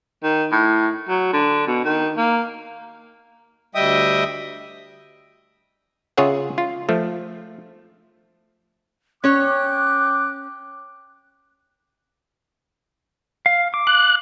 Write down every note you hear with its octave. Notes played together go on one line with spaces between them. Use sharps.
D#3
A2
F#3
D3
B2
D#3
A#3
D2 G3 D#5 E5 G5 D#6
C#3 F4 G#4 C#5 E5 F#5
F4
F3 A3
C#4 C#5 G5 D6 F#6
F5
D6
F#6